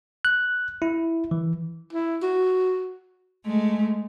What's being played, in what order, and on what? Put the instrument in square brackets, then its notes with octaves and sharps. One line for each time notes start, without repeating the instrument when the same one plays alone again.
[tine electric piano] F#6
E4
E3
[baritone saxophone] E4
F#4
[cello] G#3 A3